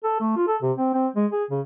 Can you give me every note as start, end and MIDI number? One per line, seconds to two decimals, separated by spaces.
0.04 0.19 69
0.21 0.34 57
0.36 0.46 65
0.48 0.56 69
0.62 0.72 48
0.78 0.90 60
0.94 1.08 60
1.16 1.27 56
1.32 1.44 68
1.51 1.61 49